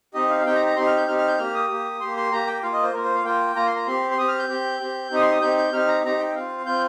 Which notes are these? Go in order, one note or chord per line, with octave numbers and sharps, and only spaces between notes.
C4 D#4 G4 D#5
F5
F5
C4 D#4 G4 G5
A#5
A#5
C4 D#4 G4 C6
F6
G6
C4 D#4 G4 F6
F6
G6
A#3 G4 F6
D#6
A#3 G4
A#3 G4 C6
C6
A#3 G4 A#5
G5
A#3 F4 F5
D#5
C5
A#3 F4 A#4
C5
F5
A#3 F4 G5
A#3 F4 A#5
C6
A#5
C4 G4 C6
C6
C4 G4 D#6
F6
G6
C4 G4
C4 G4
C4 D#4 G4 D#6
C6
D#6
C4 D#4 G4 G6
G6
C4 D#4 G4 F6
A#5
C4 D#4 G4 A#5
G5
C4 F4 F5
C4 F4 G6